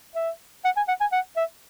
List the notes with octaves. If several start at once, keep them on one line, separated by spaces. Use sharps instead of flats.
E5
F#5
G#5
F#5
G#5
F#5
E5